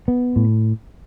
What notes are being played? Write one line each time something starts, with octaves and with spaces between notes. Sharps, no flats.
B3
A2